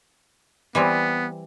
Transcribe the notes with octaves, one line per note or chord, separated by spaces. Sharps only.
E3 G3 B3 C4